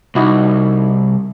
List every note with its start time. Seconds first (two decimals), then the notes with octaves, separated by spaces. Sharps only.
0.15 C2 D#4 E4 F#4